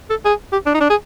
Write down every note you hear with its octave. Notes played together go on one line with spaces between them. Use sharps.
A4
G#4
G4
D4
D#4
D4
G#4